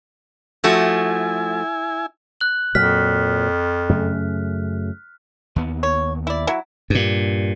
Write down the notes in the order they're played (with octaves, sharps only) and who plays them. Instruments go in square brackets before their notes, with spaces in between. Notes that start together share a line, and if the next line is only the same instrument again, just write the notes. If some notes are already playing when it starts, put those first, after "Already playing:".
[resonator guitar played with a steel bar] F3 A3 F#4 [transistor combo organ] E4 G#5
[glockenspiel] F#6 F#7
[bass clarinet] F2 [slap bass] A#2 F#3 [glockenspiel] F6 B6
[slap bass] F#2 C#3 A3
D#2 B3
[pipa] C#5
E4 D5
F#3 E4
[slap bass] G2 A#2